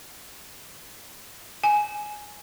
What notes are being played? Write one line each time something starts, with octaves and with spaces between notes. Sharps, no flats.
G#5